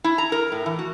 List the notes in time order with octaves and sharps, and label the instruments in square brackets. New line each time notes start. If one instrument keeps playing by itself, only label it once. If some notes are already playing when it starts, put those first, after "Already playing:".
[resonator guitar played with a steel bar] E4
A#5
A#4
A2
E3
F#4